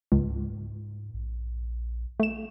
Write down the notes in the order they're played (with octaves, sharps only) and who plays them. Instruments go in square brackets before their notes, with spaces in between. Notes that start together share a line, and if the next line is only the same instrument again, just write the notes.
[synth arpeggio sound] C#2 [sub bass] G#2
[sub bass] A#1
[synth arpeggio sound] A3 E7